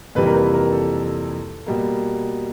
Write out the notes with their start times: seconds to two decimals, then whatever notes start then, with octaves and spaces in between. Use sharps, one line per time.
0.15 F2 C3 E3 G3 A#3 B4
0.27 A#4
0.34 B4
0.54 A#4
0.72 A4
1.66 B2 G3 A#3